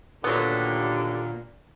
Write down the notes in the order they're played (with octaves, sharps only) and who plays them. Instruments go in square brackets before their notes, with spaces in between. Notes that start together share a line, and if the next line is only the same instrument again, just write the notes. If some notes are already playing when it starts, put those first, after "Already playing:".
[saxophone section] D#2 D3 [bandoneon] A#2 [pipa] F#3 B3